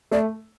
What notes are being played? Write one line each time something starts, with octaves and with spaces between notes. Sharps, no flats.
A3 D5